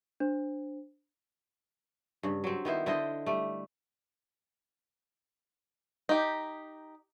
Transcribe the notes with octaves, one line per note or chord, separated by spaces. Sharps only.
D4 C5
G2 C#3
F#3 C4
D#3 B3 E4 C5
D3 E4 C5 D#5
G3 A3
D#4 G4